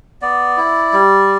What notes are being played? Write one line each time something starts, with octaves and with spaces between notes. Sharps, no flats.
B3 D5
E4
G3